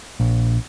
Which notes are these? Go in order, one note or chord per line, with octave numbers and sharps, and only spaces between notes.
A#1